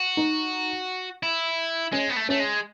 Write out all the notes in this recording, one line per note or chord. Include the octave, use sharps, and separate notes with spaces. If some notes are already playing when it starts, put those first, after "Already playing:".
Already playing: F#4
D#4
E4
G#3 C#4
B3
A3
A3 C#4
G#3